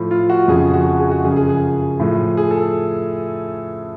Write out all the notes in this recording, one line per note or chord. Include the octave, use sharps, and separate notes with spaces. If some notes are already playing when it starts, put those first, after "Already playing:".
Already playing: A2 F3
F4
F#4
F2 C#3 F3 G#4
F#4
F#4
F#4
G#4
F#4
F#2 C#3 F3 G#4
G#4
G#4
A2 F3
G#4
A4